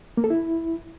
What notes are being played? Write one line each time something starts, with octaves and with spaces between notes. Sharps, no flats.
A#3
A4
E4